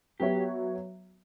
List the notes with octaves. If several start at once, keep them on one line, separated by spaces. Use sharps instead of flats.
F#3 B3 F#4 G4 C#5 E5